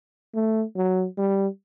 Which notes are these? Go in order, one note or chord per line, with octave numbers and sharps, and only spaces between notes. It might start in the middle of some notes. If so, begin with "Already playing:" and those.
A3
F#3
G3